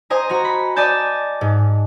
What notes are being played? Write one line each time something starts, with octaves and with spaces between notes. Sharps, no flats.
C5 D#5 G#5 A#5
F#4 A#5
B5
D5 D#5 G#5 A5 G6
G#2